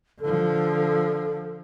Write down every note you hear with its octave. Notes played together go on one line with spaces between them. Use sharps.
D3 F3 A4